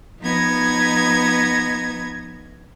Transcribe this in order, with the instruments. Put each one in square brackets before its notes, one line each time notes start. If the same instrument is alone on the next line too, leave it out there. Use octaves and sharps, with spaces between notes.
[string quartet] F3 B3 D#4 G#6 A#6